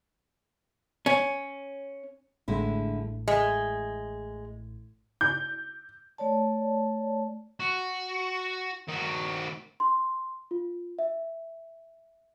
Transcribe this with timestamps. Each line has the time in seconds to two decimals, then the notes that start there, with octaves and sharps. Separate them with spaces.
1.06 C#4
2.48 A1 A2 D3 G#3 E4
3.28 G#3 E5
5.21 G6
6.18 A3 C#5 D5 A5
7.60 F#4
8.88 D#3 F#4
9.80 C6
10.51 F4
10.99 E5